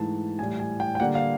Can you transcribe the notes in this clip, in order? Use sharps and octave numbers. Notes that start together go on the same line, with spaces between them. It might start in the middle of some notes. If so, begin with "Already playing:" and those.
Already playing: G#2 E3 A3 A5
A2 E3 G3 G#5
G#5
G5
G5
D3 G3 A#3 F#5
F5